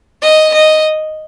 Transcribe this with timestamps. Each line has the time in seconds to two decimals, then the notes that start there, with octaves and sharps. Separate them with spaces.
0.22 D#5
0.54 D#5